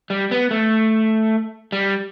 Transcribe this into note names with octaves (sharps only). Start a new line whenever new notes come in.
G3
B3
A3
G3